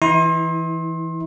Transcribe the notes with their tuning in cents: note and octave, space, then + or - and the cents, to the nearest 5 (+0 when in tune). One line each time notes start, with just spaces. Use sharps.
E3 +0 E4 -35 C6 +30